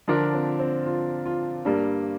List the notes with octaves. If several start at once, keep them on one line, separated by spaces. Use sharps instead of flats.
D3 F3 D4 F4 A#4
C4
C4
F4
F4
G2 G3 A#3 D4